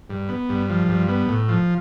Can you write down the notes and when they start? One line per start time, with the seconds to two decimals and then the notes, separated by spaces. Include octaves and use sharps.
0.10 G2
0.29 B3
0.49 G2
0.69 F3
0.89 G2
1.08 B3
1.29 A2
1.49 F3